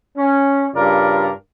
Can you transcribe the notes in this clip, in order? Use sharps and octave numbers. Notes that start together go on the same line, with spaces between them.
C#4
G2 C#3 F4 A#4 D5